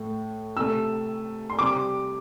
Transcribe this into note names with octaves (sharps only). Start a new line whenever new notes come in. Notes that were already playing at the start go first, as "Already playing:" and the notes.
Already playing: A2 A3
C3 A3 E6
C6
C3 G3 D6